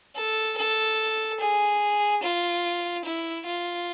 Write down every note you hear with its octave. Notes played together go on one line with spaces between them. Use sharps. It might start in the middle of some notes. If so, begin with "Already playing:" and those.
A4
A4
G#4
F4
E4
F4